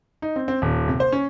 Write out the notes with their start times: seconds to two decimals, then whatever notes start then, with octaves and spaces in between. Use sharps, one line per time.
0.22 D#4
0.36 C4
0.48 C4
0.62 D#1
0.88 C3
1.00 C5
1.12 C#4